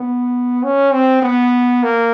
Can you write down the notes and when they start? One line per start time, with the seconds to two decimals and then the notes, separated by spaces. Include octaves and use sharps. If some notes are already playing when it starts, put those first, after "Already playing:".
Already playing: B3
0.63 C#4
0.93 C4
1.22 B3
1.83 A#3